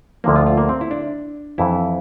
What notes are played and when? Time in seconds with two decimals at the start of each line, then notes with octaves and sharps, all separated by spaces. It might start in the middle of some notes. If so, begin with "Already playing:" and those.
0.24 D2 D3 F3 A#3
0.36 F4
0.46 F4
0.57 A#3
0.69 C4
0.81 E4
0.91 D4
1.58 F2 E3 E4